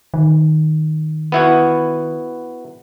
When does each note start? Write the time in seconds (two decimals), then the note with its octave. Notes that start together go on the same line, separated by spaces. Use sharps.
0.14 D#3
1.32 B3 E4 F#4